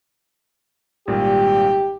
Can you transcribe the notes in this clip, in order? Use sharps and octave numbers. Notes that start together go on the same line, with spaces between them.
G#1 A#2 G3 G4